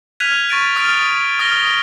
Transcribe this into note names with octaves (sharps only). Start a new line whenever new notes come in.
F6 F#6 G#6 B6 D#7 F7
C#6 A6 D7 D#7
D#6 F6 A6 D7
D#6 F6 A#6 G7